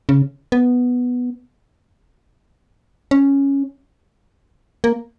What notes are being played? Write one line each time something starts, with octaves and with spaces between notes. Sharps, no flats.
C#3
B3
C#4
A#3